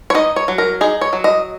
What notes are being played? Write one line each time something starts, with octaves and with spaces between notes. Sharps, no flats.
C#5
D#4 D#5
C#5
F#3
A#4
D#4 G#4
C#5
F#3
D#5